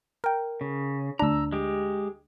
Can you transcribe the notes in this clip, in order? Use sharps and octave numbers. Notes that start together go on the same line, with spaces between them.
A#4 G5
C#3
D2 D4 A#5 E6
G#3 G4